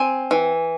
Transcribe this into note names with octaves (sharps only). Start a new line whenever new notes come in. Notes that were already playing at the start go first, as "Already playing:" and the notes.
Already playing: C4 G#5
E3